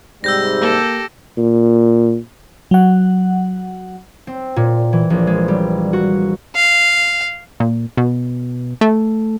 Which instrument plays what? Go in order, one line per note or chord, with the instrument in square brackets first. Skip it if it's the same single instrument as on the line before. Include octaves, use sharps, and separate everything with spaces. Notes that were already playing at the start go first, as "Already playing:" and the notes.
[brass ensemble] G#2 C3 G3 [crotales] E6 G6 A#6
[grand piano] A#3 [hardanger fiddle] G4 A4
[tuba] A#2
[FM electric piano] F#3 F#5
[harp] C4
A#2
E3
A#1
G#3
G3
F#4
[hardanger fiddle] F5
[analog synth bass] A#2
B2
A3